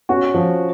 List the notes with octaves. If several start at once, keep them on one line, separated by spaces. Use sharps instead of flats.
C#4 F#4
F3